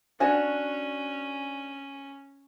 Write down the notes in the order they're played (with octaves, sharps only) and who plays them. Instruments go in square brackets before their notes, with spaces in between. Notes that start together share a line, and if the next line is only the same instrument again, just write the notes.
[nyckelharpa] C#4 [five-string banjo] D4 F#4 G#5